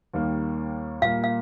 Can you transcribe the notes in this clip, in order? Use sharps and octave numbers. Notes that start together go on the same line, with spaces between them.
D#2 D#3 G3 A#3
A#2 G3 A#3 F5
F5